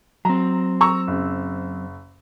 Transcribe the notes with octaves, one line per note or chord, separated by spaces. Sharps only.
F#3 C4 A#5
A#5 C#6 E6
F#1